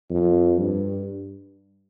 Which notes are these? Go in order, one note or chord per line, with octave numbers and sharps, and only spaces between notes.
F2
G2